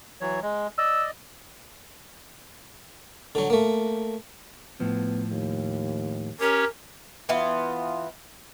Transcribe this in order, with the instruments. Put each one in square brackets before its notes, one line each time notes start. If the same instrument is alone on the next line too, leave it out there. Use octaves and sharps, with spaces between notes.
[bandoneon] E3 F#3 C#5
G#3
[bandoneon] D5 D#5 [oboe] E6
[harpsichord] D3 F#3
A3 A#3
[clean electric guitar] A2 F3 [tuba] B3
[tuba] D#2
[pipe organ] C#4 G4 C#5 [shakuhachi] A#4
[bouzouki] E3 B3 F4